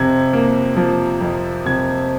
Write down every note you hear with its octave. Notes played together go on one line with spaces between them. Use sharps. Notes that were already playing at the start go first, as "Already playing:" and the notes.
Already playing: F2 C3 F3 G#6
A#3
F3
F2
C3 G#6